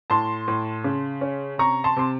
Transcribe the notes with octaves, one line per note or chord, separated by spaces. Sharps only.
A2 A5 C6
A2
C#3
C#4
C3 A#5 C#6
A5 C6
C3 C6